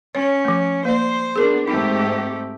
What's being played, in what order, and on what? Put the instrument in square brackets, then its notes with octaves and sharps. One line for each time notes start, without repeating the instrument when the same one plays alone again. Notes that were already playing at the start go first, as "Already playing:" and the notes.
[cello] C#4 [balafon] C#5
[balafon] F3 A3
[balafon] A#3 D5 [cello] C5
[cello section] B3 D4 [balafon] G#4 A#4
[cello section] G#2 C4 G4 [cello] A3 [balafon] D#4